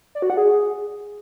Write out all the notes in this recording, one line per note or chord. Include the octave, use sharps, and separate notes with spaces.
D5
F#4
F#5
G#4